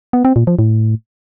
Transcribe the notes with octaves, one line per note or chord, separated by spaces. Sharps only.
B3
C4
A#2
F3
A2